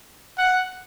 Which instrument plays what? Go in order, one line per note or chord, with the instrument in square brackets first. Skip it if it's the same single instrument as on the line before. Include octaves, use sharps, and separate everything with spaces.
[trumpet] F#5